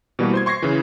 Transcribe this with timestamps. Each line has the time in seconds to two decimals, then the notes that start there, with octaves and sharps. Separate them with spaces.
0.19 B2 E3 G3 A#3 F#4
0.34 C5 C6 G#6
0.46 C6 C#6 G#6 A#6 C7
0.62 C#3 E3